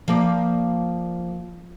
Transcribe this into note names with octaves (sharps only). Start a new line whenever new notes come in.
F3 A#3 D5